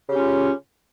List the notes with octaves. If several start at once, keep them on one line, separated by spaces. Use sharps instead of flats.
C#3 C#4 F4 G4